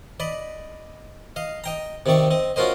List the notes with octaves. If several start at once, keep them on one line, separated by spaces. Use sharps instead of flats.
D5 D#5 B5
D#5 F5
D#5 G5 A#5
C3 D#3 C4 D5 C#6
C4 D#5
C#4 F4 F#4 A#4 C5 D#5